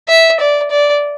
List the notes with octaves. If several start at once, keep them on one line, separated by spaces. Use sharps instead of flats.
E5
D5
D5